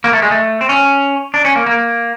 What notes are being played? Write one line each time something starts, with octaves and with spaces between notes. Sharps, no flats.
A#3
A3
G#3
A3
C4
C#4
D4
C#4
A#3
A#3